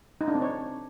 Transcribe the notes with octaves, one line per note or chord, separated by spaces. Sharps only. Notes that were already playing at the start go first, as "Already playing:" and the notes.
D#4
D4
C4
C#5